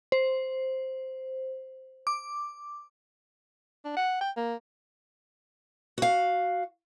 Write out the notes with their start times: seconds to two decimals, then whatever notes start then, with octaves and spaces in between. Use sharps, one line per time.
0.12 C5
2.07 D6
3.85 D4
3.97 F#5
4.21 G5
4.37 A#3
5.98 F#4 F5